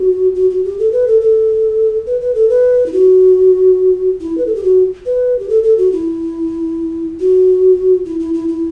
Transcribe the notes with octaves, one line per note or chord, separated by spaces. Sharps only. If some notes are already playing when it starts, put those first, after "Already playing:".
Already playing: F#4
F#4
F#4
G4
A4
B4
A4
A4
B4
B4
A4
B4
E4
F#4
E4
B4
A4
G4
F#4
B4
G4
A4
A4
F#4
E4
F#4
E4
E4
E4
E4